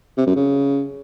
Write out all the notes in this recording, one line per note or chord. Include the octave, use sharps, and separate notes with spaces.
C3
F#2
C#3